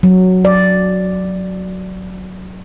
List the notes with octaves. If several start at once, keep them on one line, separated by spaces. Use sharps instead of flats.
F#3
D5